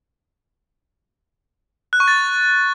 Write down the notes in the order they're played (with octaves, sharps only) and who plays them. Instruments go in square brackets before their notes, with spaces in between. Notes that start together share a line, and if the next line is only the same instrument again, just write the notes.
[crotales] F#6
C#6
A6